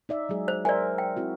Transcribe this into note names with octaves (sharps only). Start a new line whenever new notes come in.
D#4 D5 E5
F#3 G#3 G#4
C5
A#4 C5 D5 E5 G#5
G5
C4 E4 F#4